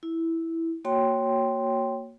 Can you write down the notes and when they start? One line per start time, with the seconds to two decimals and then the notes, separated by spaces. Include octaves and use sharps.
0.03 E4
0.85 A#3 F#4 C#5 G5 C6